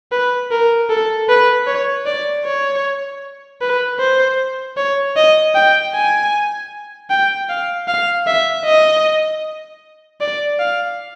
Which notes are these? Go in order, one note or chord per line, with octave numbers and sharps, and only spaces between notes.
B4
A#4
A4
B4
C#5
D5
C#5
B4
C5
C#5
D#5
G5
G#5
G5
F5
F5
E5
D#5
D5
F5